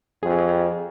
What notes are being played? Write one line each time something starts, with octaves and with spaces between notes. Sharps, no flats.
F2 G#4